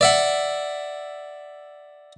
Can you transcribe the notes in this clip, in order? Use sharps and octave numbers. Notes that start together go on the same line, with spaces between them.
D5 E5 F#5